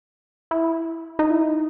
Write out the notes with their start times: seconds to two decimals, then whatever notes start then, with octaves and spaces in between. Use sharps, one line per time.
0.51 E4
1.19 D#4
1.31 E4
1.41 D#4